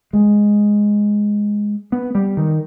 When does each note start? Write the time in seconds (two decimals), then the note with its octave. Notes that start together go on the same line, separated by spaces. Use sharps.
0.13 G#3
1.92 B3
2.15 G3
2.37 D#3